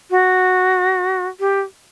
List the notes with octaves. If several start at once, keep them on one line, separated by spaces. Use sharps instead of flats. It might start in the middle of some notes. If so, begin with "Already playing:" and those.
F#4
G4